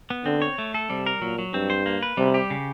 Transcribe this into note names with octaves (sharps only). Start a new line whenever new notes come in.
B3
D3 C4
C#5
A3
A4
C3 G3
A#4
A#2 F#3
F#3
G2 C4
C5
A#3
B4
C3 G3
G4
C#3